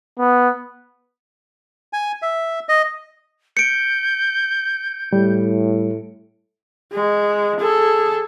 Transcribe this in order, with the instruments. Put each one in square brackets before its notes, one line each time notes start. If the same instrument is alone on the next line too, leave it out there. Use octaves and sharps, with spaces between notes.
[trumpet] B3
[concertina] G#5
E5
D#5
[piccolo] G6 [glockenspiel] C#7 D7
[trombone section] A2 [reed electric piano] G3
[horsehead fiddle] G#3
G#4 A4